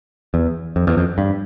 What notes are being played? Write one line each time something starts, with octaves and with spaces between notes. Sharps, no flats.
E2
F2
E2
F2
G2